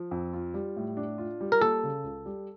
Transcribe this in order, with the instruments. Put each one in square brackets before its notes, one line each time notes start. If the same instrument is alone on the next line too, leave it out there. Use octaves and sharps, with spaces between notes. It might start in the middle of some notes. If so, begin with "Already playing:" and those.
Already playing: [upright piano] F3
F2
F4
G3
A2
D4
F4
G3
[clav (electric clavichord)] A#4
[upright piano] A#3 [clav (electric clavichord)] A4
[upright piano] C#3
C#2
G3